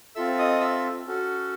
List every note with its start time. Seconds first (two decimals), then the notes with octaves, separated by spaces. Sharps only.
0.15 C4 F4 A4 E5 E6
0.39 D#5 D#6
0.60 E5 E6
1.06 C#4 F#4 A4